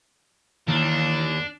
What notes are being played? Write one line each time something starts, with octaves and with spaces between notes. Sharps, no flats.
D#2 D#3 E3 D4 A#4